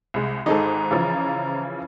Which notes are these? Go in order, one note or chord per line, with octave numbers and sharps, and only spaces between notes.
C2 G#3
G#1 G#2 D#4 G#4 A4 A#5
C#3 E3 F3